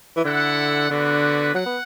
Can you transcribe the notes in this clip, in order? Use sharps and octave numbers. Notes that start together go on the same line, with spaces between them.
E3
D3 E4 A4 F#5
D3 B3 D4 F#4 B4
F#3 F#5
B3